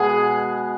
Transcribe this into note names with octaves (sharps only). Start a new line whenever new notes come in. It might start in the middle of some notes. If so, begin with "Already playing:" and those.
Already playing: B2 G#3 B3 G#4